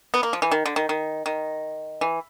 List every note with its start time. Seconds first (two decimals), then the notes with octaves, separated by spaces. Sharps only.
0.14 B3
0.23 A#3
0.33 F3
0.42 E3
0.51 D#3
0.66 D3
0.76 D#3
0.89 D#3
1.26 D#3
2.01 E3